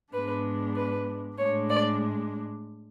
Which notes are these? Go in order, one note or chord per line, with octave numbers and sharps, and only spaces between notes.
G#2 G#3 B3 D4 B4
B4
A2 G#3 D4 C#5
D5